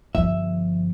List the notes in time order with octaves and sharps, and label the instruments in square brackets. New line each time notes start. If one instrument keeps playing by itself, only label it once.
[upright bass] G1 F3 [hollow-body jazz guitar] E5